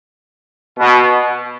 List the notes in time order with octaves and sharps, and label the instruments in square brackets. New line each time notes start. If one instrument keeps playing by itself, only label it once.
[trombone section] B2